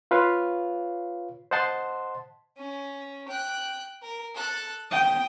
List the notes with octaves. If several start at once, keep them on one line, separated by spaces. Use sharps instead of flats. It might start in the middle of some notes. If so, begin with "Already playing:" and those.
F4 B4 C#5 F5
C5 D#5 F#5 A5 C6
C#4
G5 F#6
A#4
A4 F#6
G5 D#6